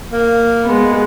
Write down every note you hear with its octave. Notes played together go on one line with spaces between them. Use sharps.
A#3
G#3 B3